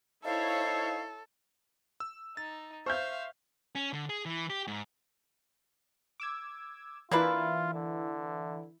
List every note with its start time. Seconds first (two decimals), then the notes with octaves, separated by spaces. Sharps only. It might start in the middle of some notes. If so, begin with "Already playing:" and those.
0.24 D#4 E4 A4 C5 C#5 F5
2.00 E6
2.37 D#4 A6
2.86 C5 E5 F5 C#6 F6 G6
3.75 C#4
3.93 D3
4.10 G#4
4.26 E3
4.50 G4
4.67 G#2
6.20 D6 E6 G#6
7.11 E3 A#3 D4 E4 F4 B4
7.74 D3